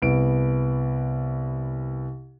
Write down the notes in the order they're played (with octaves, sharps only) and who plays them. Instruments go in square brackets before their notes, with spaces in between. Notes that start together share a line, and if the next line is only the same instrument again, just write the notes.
[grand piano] C2 B3 D7